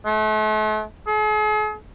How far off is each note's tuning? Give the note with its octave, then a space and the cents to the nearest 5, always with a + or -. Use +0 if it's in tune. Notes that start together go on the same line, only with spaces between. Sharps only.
A3 -40
G#4 +45